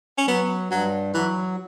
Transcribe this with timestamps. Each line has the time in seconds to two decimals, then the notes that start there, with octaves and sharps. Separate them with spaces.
0.18 C#4
0.27 F#3 B3
0.70 G2 F#3
1.14 E3 F#3